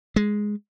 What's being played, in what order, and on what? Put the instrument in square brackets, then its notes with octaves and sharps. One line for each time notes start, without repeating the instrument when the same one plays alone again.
[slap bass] G#3